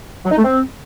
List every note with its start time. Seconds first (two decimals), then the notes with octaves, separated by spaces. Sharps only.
0.25 F#3
0.31 D#4
0.38 A3
0.45 C4